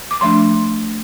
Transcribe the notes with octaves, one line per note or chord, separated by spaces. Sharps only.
D6
F3 A3 D4 C6